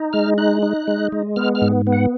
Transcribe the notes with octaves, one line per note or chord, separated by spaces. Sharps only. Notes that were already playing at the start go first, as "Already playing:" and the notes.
Already playing: D#4
G#3 F6
D#4 F#6
D#4
G#3
G#3
B3 F6
F6
G#2
B3
F#5